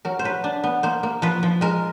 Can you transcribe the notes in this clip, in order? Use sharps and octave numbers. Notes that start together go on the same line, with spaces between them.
F#3 A#4
C5
F#3 B4
D4
B3
A#3 C5
A#3
F3 B4
F3
G#3 A#4